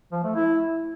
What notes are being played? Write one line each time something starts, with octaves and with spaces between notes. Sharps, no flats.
F3
A3
E4